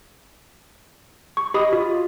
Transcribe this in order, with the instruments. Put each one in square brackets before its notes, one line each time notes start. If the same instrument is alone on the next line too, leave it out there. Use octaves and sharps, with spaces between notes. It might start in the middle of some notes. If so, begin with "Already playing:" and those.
[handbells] C#6
[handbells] G4 B5 D#6 [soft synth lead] D#5
[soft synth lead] F4 [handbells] F#4